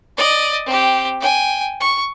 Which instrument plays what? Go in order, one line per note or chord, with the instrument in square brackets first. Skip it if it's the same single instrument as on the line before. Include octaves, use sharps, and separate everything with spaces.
[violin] D5 D#5
C4 G4
G5 G#5
C#6